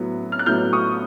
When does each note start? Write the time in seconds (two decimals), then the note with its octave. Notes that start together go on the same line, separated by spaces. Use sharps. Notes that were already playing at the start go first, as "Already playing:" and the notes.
Already playing: A2 F#3 B3
0.32 F6
0.39 F#6
0.46 A2 F#3 B3 F6 G6
0.73 C#6 D#6